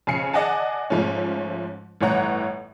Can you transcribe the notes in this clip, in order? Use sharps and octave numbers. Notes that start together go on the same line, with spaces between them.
F2 C#3 G#5 C7 C#7
G#4 D5 D#5 F#5 G#5 A5
G#2 F3 A3 C#4
G1 A2 E3 C#5 F#5 A#5